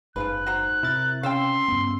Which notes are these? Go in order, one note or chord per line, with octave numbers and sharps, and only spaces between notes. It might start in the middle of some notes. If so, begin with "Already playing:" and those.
F#1 G#2 F3 F4 B4 F#6
F#4 C5 A#5
C3 E4 A#4 A6
C#3 F5 G5 C6 E6
G2 B3